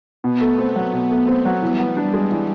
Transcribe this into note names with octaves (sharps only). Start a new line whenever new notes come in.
B2 B3
A3
C4
F#3
B2
A3
C4
F#3
E3 G3
B3
D4
G#3
E3